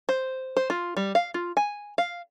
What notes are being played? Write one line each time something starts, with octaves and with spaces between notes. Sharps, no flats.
C5
C5
F4
G3
F5
F4
G#5
F5